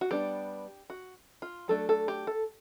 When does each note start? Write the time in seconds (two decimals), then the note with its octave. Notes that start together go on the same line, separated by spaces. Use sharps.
0.01 F#4
0.11 G3 B3 D4 G4
0.90 F#4
1.42 F4
1.68 F#3 A3 D4 A4
1.89 A4
2.08 G4
2.27 A4